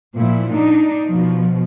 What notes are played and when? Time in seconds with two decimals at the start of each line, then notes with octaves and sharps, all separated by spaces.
0.15 A#2 F3 E4
0.52 D4 D#4
1.07 B2 F3